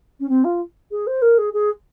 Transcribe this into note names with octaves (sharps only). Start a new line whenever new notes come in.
C#4
C4
F4
G#4
C5
A#4
G#4
G#4